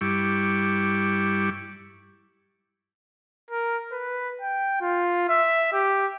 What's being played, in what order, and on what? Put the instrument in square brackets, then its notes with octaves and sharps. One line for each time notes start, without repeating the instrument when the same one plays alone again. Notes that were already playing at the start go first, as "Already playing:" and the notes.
[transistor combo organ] G2 G3 E4 C#6 D6
[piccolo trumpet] A#4
B4
G5
F4
E5
G4